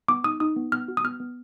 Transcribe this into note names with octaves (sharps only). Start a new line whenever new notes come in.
B3 D6
D#4 D#6
D#4 D#6
B3
B3 F6
F#4
D#6
B3 F6
B3